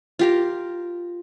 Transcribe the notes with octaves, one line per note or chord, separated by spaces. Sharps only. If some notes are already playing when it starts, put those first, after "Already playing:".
F4 G4 A#4